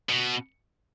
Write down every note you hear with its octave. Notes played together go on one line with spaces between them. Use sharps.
B2